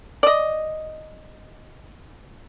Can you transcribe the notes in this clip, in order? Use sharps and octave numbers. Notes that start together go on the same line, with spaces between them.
D5 D#5